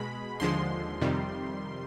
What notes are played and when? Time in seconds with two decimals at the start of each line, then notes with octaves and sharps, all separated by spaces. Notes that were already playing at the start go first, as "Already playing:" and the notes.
Already playing: B2 G#3 B5
0.40 D#2 D3 F3 G#3 C6
1.01 F2 C3 D#3 G3